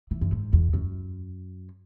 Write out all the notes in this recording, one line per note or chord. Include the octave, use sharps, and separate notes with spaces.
E3
F#2
G#2
E2
F#2